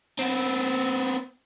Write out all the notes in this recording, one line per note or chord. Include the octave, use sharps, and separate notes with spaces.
B3 C4